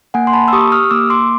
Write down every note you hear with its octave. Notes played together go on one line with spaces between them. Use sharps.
A#3 F#5 G#5
C6
A5 B5
E6
G4 C#6 D#6
D#6 F6
A#3 D6 E6
C6 D6